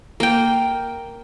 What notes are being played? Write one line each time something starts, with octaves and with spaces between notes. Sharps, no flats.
A#3 G5